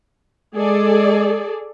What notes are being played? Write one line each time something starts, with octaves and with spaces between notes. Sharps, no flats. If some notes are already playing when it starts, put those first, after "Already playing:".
G#3 G#4 A4 D5